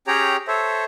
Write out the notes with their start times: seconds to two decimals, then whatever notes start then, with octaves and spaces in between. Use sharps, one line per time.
0.07 C#4 G4 G#4 C#5 G5 A#5
0.48 A4 C5 C#5 E5